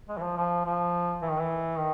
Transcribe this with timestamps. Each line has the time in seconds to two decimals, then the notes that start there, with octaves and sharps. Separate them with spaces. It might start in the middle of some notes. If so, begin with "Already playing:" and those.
0.09 G#3
0.18 E3
0.22 F3
0.37 F3
0.65 F3
1.22 E3
1.31 D#3
1.41 E3
1.79 D#3